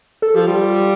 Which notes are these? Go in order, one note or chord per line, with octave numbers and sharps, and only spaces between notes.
A4
F3 G4
G3 F4